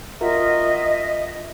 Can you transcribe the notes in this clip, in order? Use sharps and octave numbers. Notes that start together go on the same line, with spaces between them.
F4 F#4 A#4 D#5 E5